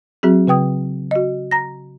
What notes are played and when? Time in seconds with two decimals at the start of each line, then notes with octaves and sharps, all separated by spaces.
0.23 F#3 C4 F#4 G#4
0.47 C#3 B4 G5 D#6
1.11 F#4 D#5
1.51 A#5 A#6